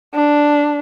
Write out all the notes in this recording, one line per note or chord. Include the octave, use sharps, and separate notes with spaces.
D4